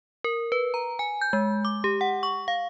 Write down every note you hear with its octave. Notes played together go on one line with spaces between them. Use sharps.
A#4
B4
A#5
G#5
G6
G#3
D6
G4
F#5
C#6
F5